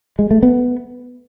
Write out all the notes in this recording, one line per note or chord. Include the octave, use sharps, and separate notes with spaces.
G#3
A3
B3